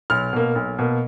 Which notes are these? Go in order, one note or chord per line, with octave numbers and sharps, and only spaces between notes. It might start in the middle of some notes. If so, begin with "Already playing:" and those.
B1 F6
B2 A#3
B1
B2 A#3